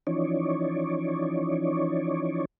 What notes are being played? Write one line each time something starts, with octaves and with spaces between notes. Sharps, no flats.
E3 F3 C#4 D#4 C#5 D5